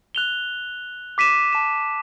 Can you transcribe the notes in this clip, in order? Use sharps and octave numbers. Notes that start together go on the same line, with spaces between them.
F#6 F7 G7
D6 B6 D#7 E7
A5 E7